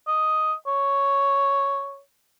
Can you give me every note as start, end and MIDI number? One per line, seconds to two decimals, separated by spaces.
0.07 0.53 75
0.66 1.99 73